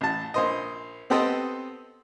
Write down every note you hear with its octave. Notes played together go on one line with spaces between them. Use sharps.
A1 A5
A#1 C5 D#5
B3 C4 G4 A4 C5 D#5